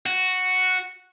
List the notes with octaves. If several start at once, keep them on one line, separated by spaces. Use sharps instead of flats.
F#4